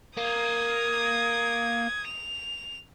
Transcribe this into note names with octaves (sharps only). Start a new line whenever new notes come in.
A#3 D#6 G#6
F7